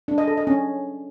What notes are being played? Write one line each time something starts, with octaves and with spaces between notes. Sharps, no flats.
D4
D#5
A4
D#5
C#4